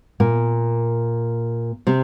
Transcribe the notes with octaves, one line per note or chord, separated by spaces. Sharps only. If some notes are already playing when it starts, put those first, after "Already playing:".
A#2 A#3
C3 C4